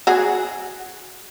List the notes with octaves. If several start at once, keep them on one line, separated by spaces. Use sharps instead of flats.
F#4 G#4